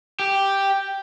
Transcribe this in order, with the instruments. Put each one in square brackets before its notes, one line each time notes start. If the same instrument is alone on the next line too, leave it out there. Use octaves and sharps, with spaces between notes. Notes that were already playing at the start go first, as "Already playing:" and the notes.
[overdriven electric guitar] G4